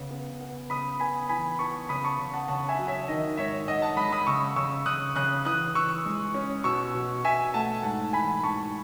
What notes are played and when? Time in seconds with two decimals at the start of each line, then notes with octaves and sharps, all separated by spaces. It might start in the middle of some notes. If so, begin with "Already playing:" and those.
Already playing: C#3 B3
0.11 B3
0.41 B3
0.70 C#3 B5 D#6
1.00 B3 G#5 B5
1.29 E3 G#5 B5
1.59 B3 A5 C#6
1.89 C#3 B5 D#6
2.04 A5 C#6
2.19 C#3
2.33 F#5 A5
2.48 C#3 F#5 A5
2.69 E5 G#5
2.79 F#3
2.88 C#5 E5
3.08 D#3 D#5
3.37 G#2 C#5 E5
3.68 G#2 D#5 F#5
3.82 F#5 A5
3.97 G#3 B5 D#6
4.12 B5 D#6
4.27 C#3 C#6 E6
4.56 C#3 C#6 E6
4.86 C#3 D#6 F#6
5.16 C#3 D#6 F#6
5.45 E3 D#6 F#6
5.75 E3 C#6 E6
6.06 G#3
6.34 C#4
6.64 B2 C#6 E6
6.95 B2
7.24 B2 E5 G#5
7.54 A3 F#5 A5
7.83 G#2 F#5 A5
8.13 E3 G#5 B5
8.43 G#2 A5 C#6